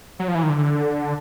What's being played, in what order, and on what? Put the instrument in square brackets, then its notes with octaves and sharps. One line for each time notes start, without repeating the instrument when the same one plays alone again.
[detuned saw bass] F#3
F3
E3
D#3
D3